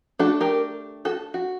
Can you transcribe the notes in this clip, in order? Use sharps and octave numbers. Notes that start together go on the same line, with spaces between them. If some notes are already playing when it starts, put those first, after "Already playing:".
A3 D4 F#4 A4
G4 A#4
F#4 A4
F#4